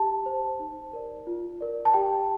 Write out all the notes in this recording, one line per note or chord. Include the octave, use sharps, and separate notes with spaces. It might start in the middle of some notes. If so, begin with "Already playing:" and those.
Already playing: G4 A5
C5
D#4
A#4 D5
F4
A#4 D5
A5
G4 G5